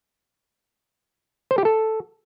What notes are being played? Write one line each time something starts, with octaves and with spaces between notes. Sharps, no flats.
C5
G4
A4